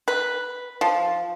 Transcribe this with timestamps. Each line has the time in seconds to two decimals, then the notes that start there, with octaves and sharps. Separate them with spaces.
0.08 B4
0.81 F3